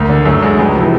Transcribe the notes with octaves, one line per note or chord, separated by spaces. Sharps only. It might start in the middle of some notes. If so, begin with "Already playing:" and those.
Already playing: D2 A#3
D3
F#2 A3
D3 G#3
C#2 F#3
C3 E3 F3